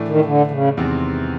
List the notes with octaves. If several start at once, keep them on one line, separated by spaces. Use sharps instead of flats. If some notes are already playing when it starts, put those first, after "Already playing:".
Already playing: A2 E3 A3 D4
D#3
D3
D3
C#3
E2 C3 D#3 G#3 C4